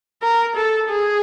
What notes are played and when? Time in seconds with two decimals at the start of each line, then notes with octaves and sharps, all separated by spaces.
0.22 A#4
0.55 A4
0.89 G#4